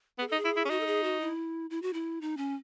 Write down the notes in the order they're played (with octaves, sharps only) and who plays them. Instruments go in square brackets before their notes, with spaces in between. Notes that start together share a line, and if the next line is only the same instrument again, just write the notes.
[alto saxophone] B3 [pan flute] G#4
[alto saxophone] D#4 [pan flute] A4
[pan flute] G#4
[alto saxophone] E4
E4
C#4
[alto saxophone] D#4 [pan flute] F#4
[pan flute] A4
G#4
F#4
E4
E4
F#4
E4
D#4
C#4